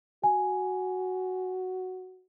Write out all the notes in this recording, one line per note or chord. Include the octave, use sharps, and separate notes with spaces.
F#4 G#5